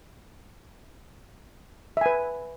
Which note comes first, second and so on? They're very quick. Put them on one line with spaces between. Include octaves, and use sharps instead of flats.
E5 G#5 B4